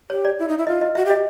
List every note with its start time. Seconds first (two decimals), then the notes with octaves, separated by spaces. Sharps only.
0.10 G4 C#5
0.25 D5
0.39 E4
0.48 D#4
0.58 E4
0.67 F4 D#5
0.81 D#5
0.95 F#4 E5
1.05 G4
1.10 D#5